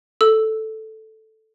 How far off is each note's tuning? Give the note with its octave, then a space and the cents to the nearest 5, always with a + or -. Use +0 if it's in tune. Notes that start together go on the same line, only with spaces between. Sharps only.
A4 +0 E6 +0